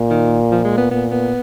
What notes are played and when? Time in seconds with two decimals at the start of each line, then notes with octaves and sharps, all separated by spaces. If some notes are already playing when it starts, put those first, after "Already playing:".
Already playing: A#2
0.11 D#3
0.52 F3
0.65 G#3
0.78 B3
0.91 A#2 B3
1.11 B3